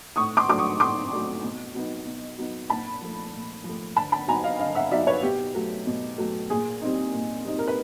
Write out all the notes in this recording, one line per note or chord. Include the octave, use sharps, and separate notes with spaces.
A2 C#6 D#6
C6 D6
F#3 A3 D4 D6
C#6 D#6
A2 C6 D6
F#3 A3 D4
B2
F#3 B3 D#4
B2
F#3 B3 D#4
A#2 A5 B5
F3 A3
A#2
F3 A3
D3 A5 B5
A5 B5
F#3 B3 D#4 G#5 A#5
D#5 F5
D3 D#5 F5
E5 F#5
F#3 B3 D#4 D5 E5
B4 C#5
B2 G4
F#3 A3
B2
F#3 A3
A#2 G#4
G3 C4 D#4
A#2
G3 C4 D#4
A#4
B4